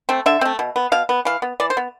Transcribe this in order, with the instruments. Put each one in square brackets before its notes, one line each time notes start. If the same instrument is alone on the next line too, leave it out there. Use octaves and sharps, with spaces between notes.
[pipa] A3 C4
D3 E5
A3 C4
B2
B3
B2 F5
B3
E3 F5
B3
E3 D5
C5
B3